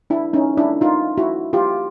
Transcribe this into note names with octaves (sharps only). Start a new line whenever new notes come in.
D4 E4
C#4 D#4
D4 E4
D#4 F4
E4 F#4
F4 G4